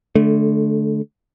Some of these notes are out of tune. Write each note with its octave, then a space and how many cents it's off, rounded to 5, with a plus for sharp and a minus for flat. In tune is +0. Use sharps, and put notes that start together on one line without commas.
D3 +0 A3 -25